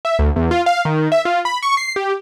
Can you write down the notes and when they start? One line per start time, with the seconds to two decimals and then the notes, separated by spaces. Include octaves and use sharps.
0.05 E5
0.19 D2
0.36 E2
0.51 F4
0.66 F5
0.85 D#3
1.12 E5
1.25 F4
1.45 B5
1.63 C#6
1.77 C7
1.96 G4